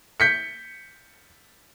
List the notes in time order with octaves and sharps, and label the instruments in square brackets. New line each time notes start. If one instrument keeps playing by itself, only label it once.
[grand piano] G6 B6 C#7